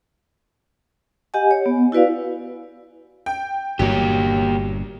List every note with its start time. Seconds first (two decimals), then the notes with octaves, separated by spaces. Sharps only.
1.34 G4 D#5 F#5 G#5
1.51 C#5
1.66 B3
1.92 E4 F#4 B4 D5 F5
3.26 G5
3.79 G1 G2 A#2 F#3 A#3 G4